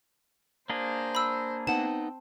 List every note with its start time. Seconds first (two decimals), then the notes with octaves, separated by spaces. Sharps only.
0.70 A#3 D4 G#4 C5
1.15 B5 E6
1.67 B3 C4 D#4 F#5 A5